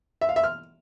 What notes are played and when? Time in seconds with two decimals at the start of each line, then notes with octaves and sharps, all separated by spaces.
0.21 E5
0.29 F5
0.36 E5
0.44 F6